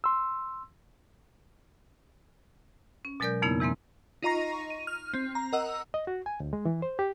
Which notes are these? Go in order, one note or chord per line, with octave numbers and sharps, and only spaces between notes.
C6 E6
C#4
B2 F#3 G#3 A#4 D5 G6
F2 C#3 A#3 B3 D#4 E4
C3 E3 G#3 A#3 C4
D#4 F4 D#5 A#5 C#6 A#6
D#7
F6
C4
A#5
A#4 D#5 F#5 E6
D#5
F#4
G#5
D2
G#3
E3
C5
G4